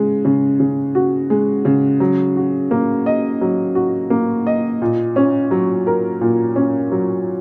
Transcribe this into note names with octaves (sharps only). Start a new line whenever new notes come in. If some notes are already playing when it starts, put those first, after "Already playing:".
Already playing: C#3 G#3
C#3
C#3
F#4
G#3
C#3
F#3
F#4
A#3
D#5
F#3
F#4
A#3
D#5
A#2
C#4
F#3
A#4
A#2
C#4
F#3